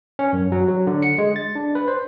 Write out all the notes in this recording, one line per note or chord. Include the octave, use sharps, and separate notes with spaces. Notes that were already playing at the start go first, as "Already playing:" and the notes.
C#4
F#2
F#3
F#3
D3
C#7
G#3
A6
D4
B4
C5